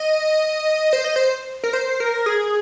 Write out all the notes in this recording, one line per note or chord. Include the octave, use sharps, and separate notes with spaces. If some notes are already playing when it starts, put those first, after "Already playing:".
Already playing: D#5
C5
D#5
C5
A#4
C5
A#4
G#4